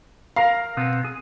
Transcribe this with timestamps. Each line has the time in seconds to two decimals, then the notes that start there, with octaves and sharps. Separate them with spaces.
0.36 A#4 F5 A#5
0.77 B2 B3 C4
1.05 G#4